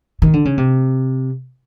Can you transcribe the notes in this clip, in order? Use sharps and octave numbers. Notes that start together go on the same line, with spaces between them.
D#3
D3
C#3
C3